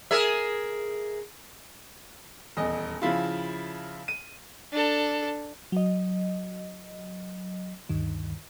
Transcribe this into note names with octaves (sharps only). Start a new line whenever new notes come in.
G#4 A#4 E5
D#1 E2 D#5
C#3 F3 E4 F4
D#7
D4 A4
F#3 D#5
D2 G2 D#3